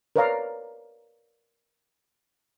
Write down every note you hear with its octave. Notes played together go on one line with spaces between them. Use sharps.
A#4 B4 C#5 D5 F5 A#5